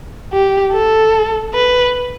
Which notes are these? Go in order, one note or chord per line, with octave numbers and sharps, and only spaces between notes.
G4
A4
B4